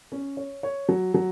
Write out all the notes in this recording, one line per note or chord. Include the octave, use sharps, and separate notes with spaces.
C#4
C#5
C#5
F#3
F#3